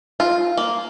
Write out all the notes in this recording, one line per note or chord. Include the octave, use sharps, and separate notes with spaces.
F4
A#3